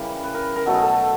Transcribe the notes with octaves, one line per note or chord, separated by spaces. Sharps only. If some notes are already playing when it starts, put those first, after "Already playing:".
Already playing: C#3 E3 G3 A#4
B4
A#4
A#4
B2 F#3 A3 A4
G#4
A4